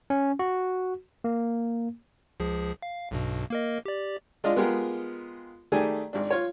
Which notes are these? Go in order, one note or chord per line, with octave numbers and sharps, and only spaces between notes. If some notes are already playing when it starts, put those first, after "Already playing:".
C#4
F#4
A#3
C#2 F3 G#4
F5
B1 G2 B2
A#3 A#4 D#5
G4 D5
G#3 D4 F4 D#5 F5
G#3 B3 F4 G4 G#4 A#4
D#3 A3 G4 G#4 D5 G#5
G#1 D4
F4 C#5